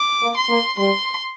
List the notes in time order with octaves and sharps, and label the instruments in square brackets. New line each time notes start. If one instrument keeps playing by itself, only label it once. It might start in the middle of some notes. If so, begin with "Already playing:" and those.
Already playing: [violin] D6
[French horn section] A#3
[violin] C6
[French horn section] A#3
[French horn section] G3 [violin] C6